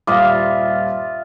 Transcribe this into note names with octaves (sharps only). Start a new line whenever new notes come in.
D#1 G2 F4 E5 F5 D6 D#6